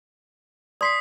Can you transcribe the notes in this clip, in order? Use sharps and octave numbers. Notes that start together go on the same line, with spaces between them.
D5 C6 D#6 B6 C7